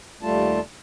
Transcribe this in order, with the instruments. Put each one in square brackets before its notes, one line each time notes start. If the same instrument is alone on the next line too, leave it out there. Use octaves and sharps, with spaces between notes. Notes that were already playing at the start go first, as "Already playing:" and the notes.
[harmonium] D#2 G3 A3 F4 A5